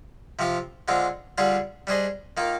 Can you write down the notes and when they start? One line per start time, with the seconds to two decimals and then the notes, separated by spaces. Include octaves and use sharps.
0.39 C3 F3 C4 F4
0.88 D3 G#3 C4 F4
1.38 D3 G3 D4 F4 G#4
1.87 G3 D4 G#4 C5 D#5
2.37 D#3 A#3 F4